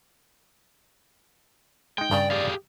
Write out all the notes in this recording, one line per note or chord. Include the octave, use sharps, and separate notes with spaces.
G#3 D#4 G5
G2 C#3 D5
G4 G#4 F5